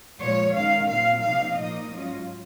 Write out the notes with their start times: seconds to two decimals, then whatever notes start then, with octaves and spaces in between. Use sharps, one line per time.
0.21 A#2 F3 G#3 C#5
0.55 D#3 G#3 C#4 F5
0.88 A#2 F#3 C4 F5
1.22 C3 F3 A#3 D#4 F5
1.55 A#2 F3 A#3 D#4 D#5
1.89 G#2 F#3 C#4 F4